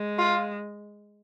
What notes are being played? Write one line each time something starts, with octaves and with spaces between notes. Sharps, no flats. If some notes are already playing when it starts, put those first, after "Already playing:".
Already playing: G#3
F4